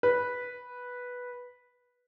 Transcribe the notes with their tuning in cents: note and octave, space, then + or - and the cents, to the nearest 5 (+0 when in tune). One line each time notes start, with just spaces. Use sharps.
B4 -5